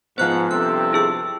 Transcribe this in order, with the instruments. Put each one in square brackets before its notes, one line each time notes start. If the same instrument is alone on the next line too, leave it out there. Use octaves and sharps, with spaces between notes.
[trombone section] G#2 [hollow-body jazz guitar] F3 B3 [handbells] C5 F#6 [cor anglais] F#5
[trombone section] G2 C3 C4 [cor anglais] A4 [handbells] F#6
[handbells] E4 G#4 E6